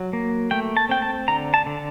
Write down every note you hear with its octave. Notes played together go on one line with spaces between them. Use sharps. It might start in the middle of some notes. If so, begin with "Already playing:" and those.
Already playing: F#3
A#3
A3 G5
A5
C4 G5
A5
D3 A#5
A5
D3